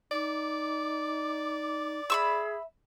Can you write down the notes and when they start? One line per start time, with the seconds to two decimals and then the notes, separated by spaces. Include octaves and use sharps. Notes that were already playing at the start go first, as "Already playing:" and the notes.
0.12 D#4 D5 D6
2.10 G#4 E5 B5 C#6 E6